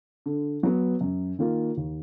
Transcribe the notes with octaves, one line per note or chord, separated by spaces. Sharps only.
D3
F#3 B3
F#2
D#3 A#3 F4
D#2